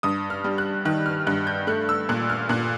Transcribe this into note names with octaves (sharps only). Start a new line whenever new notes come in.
G2 D#6
F6
G3
F#6
D#3 F#6
F6
G2 F#6
G6
A3 F#6
E6
A#2 F#6
F6
A#2 F#6